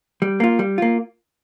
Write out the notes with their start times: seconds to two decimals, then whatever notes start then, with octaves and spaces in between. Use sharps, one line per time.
0.22 G3
0.40 A#3 F4
0.59 G3
0.78 A#3 F4